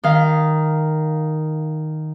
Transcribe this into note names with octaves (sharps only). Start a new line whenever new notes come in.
D#3 F5